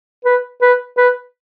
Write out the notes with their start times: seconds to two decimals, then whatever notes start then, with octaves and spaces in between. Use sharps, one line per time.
0.25 B4
0.62 B4
0.97 B4